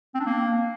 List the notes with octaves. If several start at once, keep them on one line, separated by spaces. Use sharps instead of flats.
C4
D4
A#3